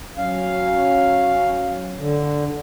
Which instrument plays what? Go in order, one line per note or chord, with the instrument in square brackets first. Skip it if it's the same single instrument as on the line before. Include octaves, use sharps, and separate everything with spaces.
[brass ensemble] F#3 C#4 [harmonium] F5
[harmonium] D3